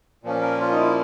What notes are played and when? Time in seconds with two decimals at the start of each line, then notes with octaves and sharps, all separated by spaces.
0.24 A#2 F3 A#3 C#4
0.42 A#4
0.61 F4
0.71 D#4
0.79 E4